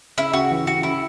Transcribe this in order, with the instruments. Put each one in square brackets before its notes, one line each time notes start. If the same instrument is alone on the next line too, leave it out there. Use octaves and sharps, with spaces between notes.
[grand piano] C#3 [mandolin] E4
[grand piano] C#3 [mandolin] F#4
[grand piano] E3
[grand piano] C#3 [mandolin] F#4
[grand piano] E3 [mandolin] E4